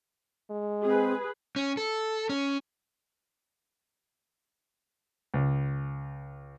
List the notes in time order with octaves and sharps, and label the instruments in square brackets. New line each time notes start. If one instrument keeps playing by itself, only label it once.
[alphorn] G#3
[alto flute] C4 [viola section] G#4 B4
[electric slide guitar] C#4
A4
C#4
[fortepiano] C#2